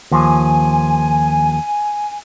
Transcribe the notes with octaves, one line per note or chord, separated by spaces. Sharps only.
D#2 F3 G#5